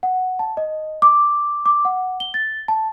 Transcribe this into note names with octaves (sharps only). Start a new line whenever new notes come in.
F#5
A5
D#5
D6
D6
F#5
G7
A6
A5